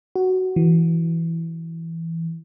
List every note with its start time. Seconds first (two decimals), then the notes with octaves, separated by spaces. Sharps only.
0.16 F#4
0.56 E3